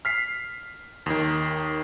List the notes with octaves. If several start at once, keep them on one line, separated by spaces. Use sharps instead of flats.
F6 B6 C7
D#2 D#3